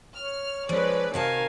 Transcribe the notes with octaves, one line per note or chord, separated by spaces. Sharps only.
C#5 F6
F3 G#3 C#4 B4 D5
C3 D#3 F#4 A#4 F5 G#5 A5